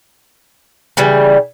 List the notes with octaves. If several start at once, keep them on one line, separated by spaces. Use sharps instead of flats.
C#3 E3 G3